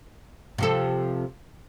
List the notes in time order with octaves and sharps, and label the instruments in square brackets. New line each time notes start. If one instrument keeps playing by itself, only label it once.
[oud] C3 F3 A4